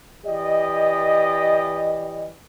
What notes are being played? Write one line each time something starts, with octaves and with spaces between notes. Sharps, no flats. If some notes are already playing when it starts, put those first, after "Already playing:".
E3 G4 D5 D#5